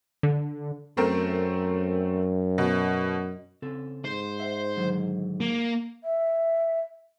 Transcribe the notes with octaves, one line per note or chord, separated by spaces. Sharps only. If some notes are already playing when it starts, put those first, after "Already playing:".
D3
F#2 A3 C4 A#4
B2
C#3 C4 A4
G#2 C5
E5 F#5
D3 D#3 F#3
A#3
E5